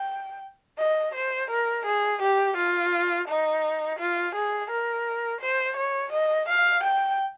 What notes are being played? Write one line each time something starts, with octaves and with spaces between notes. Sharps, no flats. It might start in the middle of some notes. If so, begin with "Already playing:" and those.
Already playing: G5
D#5
C5
A#4
G#4
G4
F4
D#4
F4
G#4
A#4
C5
C#5
D#5
F5
G5